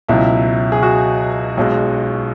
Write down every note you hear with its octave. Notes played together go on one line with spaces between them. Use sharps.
C#2 B2 F#3 E4
G#4
F#4
B1 B2 G#3